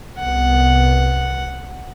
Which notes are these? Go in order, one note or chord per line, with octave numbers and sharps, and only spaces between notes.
C2 B3 F#5